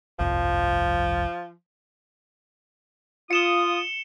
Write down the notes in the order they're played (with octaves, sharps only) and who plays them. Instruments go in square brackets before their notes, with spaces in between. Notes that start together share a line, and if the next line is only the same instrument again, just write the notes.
[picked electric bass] G1 C2 F2 [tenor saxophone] F3
[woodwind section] F4 D#6 [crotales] C#7 E7 G7